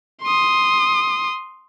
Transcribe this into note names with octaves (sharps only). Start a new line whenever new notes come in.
C6 D#6